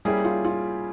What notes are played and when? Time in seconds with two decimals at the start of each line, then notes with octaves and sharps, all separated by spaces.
0.05 G3 A#3 C#4 E4 G4 G#4
0.25 F4
0.45 F4